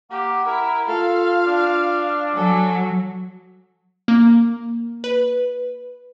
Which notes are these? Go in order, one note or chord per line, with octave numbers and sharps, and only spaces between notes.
A#3 G4 F#5
E4 A#4
F4 A4 F5
D4
F#3 A4 G#5
A#3
B4